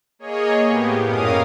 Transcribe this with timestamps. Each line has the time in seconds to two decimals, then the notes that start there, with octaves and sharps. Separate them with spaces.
0.19 A#3 G#4 C#5 D#5
0.66 A2 B3 G4
1.04 F#2 A#2 C#4 A#4 F5 D#6